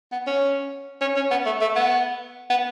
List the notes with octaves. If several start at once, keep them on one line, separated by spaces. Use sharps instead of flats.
B3
C#4
C#4
C#4
B3
A3
A3
B3
B3